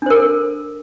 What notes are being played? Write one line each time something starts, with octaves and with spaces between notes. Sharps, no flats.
D4 A4 A#4 C5